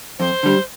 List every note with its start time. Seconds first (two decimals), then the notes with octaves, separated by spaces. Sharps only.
0.19 F2 C5
0.43 D3 G3